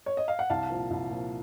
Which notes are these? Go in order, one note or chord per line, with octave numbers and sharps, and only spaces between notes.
C#5
D#5
F5
F#5
C2 F5 A5
A#2 F3
C2
A#2 F3